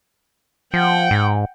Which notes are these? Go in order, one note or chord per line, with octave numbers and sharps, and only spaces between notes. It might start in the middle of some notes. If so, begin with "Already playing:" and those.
F3 F#5 G5
G#2